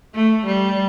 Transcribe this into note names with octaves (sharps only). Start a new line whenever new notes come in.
A3
G3